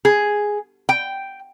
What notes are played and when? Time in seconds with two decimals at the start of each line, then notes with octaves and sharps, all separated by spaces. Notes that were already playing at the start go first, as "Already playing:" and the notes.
0.05 G#4
0.89 G5